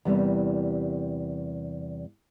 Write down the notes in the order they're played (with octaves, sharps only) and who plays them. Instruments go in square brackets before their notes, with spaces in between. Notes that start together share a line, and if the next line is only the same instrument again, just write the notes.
[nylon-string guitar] E2 C3 G3 A#3